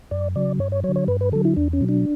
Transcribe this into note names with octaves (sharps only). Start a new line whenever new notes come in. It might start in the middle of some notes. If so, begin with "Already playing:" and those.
F#2 D5
C#3 F#3 D5
G2 C#5
C#5
F#3 C#5
D3
C#5
G2 B4
B4
D3 F#3 A4
E4
E2 D4
C#4
B2 F#3
D4